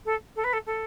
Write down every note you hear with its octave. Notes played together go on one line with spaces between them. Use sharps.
A4
A4
B4
A4
A4